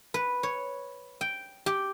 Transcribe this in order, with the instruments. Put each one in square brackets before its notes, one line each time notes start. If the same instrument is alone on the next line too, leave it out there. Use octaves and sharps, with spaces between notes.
[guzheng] B4
C#5
G5
G4